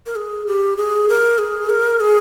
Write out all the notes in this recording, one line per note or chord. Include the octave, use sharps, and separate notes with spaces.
A#4
G#4
G4
G#4
A#4
G#4
A#4
G#4